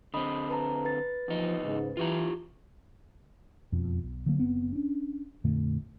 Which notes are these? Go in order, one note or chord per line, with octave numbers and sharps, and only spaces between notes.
D3 C4 D#5 B5 D#6
B4 A5 A#5
B4 A6
E2 F3 D#4
G#2 C#3
E3 F4 G4 A#5
E1 F2 B2
B1
D3 F#3 A#3
F#1 B3 C4
C#4 D4
F2 A#2 D3 A3